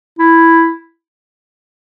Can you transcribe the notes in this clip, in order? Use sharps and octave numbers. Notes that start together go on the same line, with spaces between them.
E4